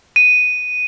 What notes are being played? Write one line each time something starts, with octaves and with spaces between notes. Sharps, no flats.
D#7